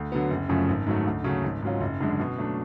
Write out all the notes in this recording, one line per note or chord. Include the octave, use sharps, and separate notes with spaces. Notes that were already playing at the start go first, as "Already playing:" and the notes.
Already playing: D2
D3 F#3 B3
F#1
F#2 C#3 F3 A3
G#1
G#2 F#3 A3
D2
C#3 F#3 A3
G#1
G#2 F#3 C#4 F4
F#1
F#2 D3 G#3 D4
B2
F#3 A3 D4